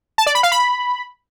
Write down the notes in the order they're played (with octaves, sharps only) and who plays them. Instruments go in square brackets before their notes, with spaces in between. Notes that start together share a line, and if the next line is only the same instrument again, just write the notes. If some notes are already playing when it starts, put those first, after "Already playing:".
[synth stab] A5
D5
B5
F5
B5